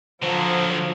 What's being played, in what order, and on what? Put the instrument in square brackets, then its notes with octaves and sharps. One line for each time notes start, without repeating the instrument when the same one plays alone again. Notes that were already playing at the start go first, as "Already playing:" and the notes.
[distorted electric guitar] D3 F#3 [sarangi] F3 [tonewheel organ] C5 A#5